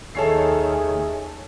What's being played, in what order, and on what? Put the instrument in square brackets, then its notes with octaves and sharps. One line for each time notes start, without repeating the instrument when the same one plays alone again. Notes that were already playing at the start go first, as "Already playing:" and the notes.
[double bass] D#2 D#3 [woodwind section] G#4 E5 G#5 [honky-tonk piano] A4 C#5 C7